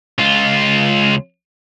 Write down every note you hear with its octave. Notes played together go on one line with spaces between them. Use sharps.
C#2 F4